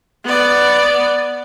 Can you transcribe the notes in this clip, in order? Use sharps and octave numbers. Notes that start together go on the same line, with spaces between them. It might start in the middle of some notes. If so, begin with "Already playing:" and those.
B3 D5